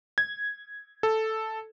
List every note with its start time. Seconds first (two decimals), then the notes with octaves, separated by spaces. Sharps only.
0.18 G#6
1.03 A4